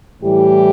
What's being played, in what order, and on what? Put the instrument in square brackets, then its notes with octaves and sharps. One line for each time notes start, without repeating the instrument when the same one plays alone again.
[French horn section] A2 E3 G3 G4